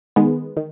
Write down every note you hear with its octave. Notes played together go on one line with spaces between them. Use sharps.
D#3 G#3 B3
D#3